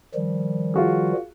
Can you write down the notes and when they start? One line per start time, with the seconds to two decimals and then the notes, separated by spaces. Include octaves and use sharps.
0.15 D#3 F3 G3
0.74 F4 F#4 G#4